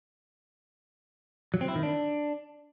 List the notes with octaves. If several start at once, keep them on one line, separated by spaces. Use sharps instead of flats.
F#3
C4
E4
D#3
D4